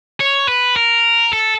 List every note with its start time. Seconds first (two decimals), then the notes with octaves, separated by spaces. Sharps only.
0.20 C#5
0.48 B4
0.76 A#4
1.33 A4